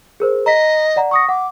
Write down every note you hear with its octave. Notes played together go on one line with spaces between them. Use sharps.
G#4 A#4 C5
D#5 A#5 B6
D5 F#5 A#5
F#5 C#6 D#6 A#6
F#5 D6